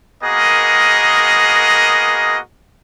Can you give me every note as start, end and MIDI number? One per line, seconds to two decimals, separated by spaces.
0.23 2.39 58
0.23 2.39 59
0.23 2.39 66
0.23 2.39 68
0.23 2.39 70
0.23 2.39 75